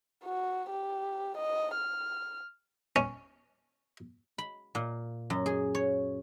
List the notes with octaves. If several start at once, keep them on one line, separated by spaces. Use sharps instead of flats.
F#4
G4
D#5
F6
C#4
B5
A#2
F#2
G#4
C#5